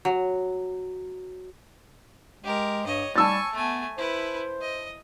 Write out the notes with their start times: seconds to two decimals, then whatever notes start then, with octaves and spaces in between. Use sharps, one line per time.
0.05 F#3
2.44 G#3 G4 A#4
2.86 G2 C#5 D#5
3.16 G3 G#5 A5 C#6 E6 A6
3.53 A3 B3 G#5
3.98 E4 B4 C5
4.61 D#5